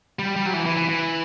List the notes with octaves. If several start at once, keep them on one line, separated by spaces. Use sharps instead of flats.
G3
G3
F#3
E3
E3
E3
E3